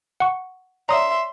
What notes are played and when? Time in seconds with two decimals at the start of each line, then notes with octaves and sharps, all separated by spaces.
0.20 F#5 C#6
0.89 C#5 D5 E5 A#5 C6 D#6